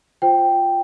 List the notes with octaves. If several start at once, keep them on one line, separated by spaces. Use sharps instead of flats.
F4 C5 G5